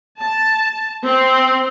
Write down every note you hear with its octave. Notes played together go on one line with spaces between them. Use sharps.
A5
C4